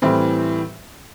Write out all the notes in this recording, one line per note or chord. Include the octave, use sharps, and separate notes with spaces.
A2 E3 G3 C4